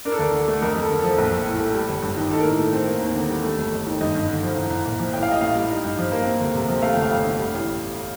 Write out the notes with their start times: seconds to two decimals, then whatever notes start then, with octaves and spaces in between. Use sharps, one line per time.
0.05 D4 A#4
0.12 A4
0.19 D2 A#4
0.33 D3
0.48 A3
0.62 F2 A#4
0.76 F2 A4
0.89 D3 A#4
1.00 F3 A4
1.18 A#1
1.31 A#1
1.46 A2
1.60 A3
1.74 G3
1.89 G1
2.02 G2
2.17 D#3
2.31 D#4 A4
2.40 A#4
2.44 A2
2.50 A4
2.59 A3
2.73 C4
2.87 A#3
3.01 D#2
3.16 D3
3.29 G3
3.44 A3
3.58 G1
3.72 F2
3.87 D#3
4.01 G2 D#5
4.15 G2
4.28 D3
4.43 F3
4.56 C2
4.70 C2
4.85 A#2
4.99 F3
5.13 A1 G5
5.23 F5
5.28 A1 D#5
5.41 A2 F5
5.55 G3
5.70 D#4
5.84 G2
5.99 F3
6.12 A#3
6.26 C4
6.40 D2
6.55 C3
6.68 F3
6.82 A3 F5
6.94 G1 G5
7.03 F5
7.11 F2
7.24 D3
7.39 G3
7.54 A1